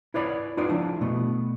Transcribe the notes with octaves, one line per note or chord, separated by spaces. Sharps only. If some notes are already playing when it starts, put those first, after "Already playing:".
E4 B4 C#5 D5 B5
D#4 F4 B4 D5
F3 D4 E4
B2 A3 B3